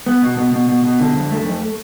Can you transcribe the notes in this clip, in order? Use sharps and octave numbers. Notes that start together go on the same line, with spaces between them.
B3
B2
B2
B2
B2
B2
D3
F2
A3
F2